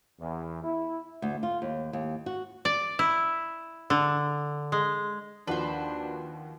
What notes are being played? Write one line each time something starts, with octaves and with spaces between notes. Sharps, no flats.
E2
E4
D2
F4
D#2
D#2
F#4
D5
E4
D3
G#3
D#2 F3 D4 F#4 B4 C5